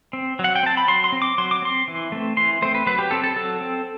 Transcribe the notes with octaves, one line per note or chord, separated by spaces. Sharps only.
C4
F#3
F#5
G5
C4 A5
B5
F#3 C6
C6
C4
D6
F#3 C6
D6
C4 C6
E3
A3 C4
E3 C6
A3 C4 C5
B4
F#3 B4
G4
C4 A4
A4
F#3 A4
C4